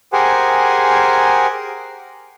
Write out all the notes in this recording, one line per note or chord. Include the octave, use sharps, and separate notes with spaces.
G4 G#4 A#4 C5 F#5 G#5